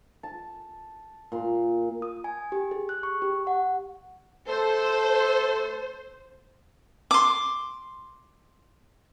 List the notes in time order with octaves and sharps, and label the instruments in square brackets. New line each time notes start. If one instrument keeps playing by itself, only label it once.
[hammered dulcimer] A5
A#2 C6
[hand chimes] D#6
G#5
G4
G#4
F#6
C#6
G4
F#5
[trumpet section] A3 A4 [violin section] C5
[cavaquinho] C6 D6